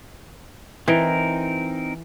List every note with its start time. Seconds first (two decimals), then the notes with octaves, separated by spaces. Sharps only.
0.88 E3 C4 D#4 A#4